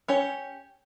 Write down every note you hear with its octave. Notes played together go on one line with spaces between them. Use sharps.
C#4 G4 C#5